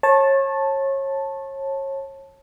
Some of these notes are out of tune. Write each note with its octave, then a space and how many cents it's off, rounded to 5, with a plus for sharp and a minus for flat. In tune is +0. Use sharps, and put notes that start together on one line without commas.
C#5 -30 A5 +0